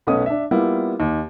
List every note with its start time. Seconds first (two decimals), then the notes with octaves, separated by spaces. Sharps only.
0.07 B1 A3 B3 C#4 D#6
0.26 D4 E5
0.51 G3 A#3 B3 E4 F4
1.00 D#2